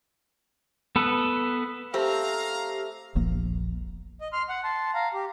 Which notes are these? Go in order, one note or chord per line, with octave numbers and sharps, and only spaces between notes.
B3 A4 B4
A3 C4 G4 F5 A#5
E1 A#1 F3 A#3
D#5
C6 F6
F#5
A5 C6
F5 A#5
G4